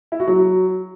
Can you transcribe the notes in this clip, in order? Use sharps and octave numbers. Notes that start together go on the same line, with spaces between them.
E4
F#4
F#3